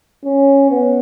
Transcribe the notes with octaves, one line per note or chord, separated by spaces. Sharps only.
C#4
B3